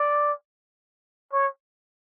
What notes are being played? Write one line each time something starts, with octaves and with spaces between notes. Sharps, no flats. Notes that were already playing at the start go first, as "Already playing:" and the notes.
Already playing: D5
C#5